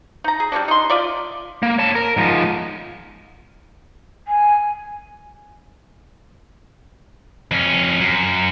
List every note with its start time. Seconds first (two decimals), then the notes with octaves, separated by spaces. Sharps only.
0.24 D#4 A#5
0.40 G#4
0.52 G3 B3 C#4 D4
0.68 D#4 C6
0.90 F4 D5 E5
1.63 A#3
1.79 C#5 A5
1.95 A#4
2.17 G#2 F3
4.27 G#5
7.51 F2 C#4
8.00 F#2